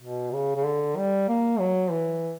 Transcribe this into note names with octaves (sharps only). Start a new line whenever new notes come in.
B2
C#3
C#3
D3
G3
A#3
F#3
E3